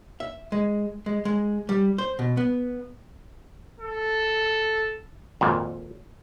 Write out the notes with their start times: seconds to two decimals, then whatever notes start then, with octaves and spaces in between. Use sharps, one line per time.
0.20 E5
0.52 G#3
1.06 G#3
1.25 G#3
1.69 G3
1.98 C5
2.19 B2
2.37 B3
3.80 A4
5.41 G#1 F2 A#2